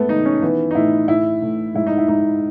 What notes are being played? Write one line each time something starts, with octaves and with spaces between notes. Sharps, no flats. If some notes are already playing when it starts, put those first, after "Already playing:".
Already playing: G#2 A3 B3
D#3 D#4
C#4
E3 B3
D#4
A2 E4
A2 E4
A2
G#2 E4
D#4
E4
G#2 D#4